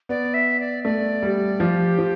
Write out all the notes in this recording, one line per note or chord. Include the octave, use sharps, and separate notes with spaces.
B3 D5
E5
D5
A3 D5
G3
F3 G4
F3